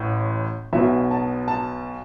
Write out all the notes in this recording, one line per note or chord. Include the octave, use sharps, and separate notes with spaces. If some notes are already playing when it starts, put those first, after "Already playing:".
Already playing: A1 A2
B1 B2 E5
A5
A5